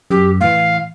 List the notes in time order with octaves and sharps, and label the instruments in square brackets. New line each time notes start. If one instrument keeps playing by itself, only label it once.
[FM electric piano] F#2 [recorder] G4
[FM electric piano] A2 E3 [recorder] F5